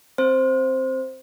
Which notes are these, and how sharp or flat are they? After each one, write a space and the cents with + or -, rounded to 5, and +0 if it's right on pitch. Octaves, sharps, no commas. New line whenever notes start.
C4 +5 C5 +0